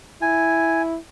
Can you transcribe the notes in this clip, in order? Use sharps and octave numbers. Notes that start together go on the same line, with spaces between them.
E4 G#5